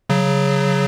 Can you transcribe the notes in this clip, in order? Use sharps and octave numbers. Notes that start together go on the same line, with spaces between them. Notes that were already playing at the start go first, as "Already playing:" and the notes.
C#3 F#3